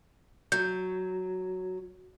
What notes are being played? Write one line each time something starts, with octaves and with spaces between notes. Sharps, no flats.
F#3 G6